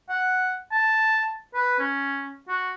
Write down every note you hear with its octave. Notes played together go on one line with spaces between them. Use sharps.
F#5
A5
B4
C#4
F#4